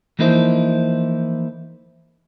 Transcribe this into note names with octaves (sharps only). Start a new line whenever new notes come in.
E3 F3 A#3 D#4 E4 C5